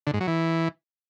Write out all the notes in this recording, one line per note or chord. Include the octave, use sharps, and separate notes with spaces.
D3
G#2
F#3
E3